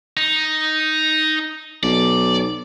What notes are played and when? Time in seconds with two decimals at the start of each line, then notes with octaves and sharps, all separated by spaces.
0.17 D#4
1.83 B1 D5